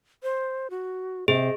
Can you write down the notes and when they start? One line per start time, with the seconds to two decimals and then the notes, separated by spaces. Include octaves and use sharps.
0.23 C5
0.70 F#4
1.28 C3 G#4 D#5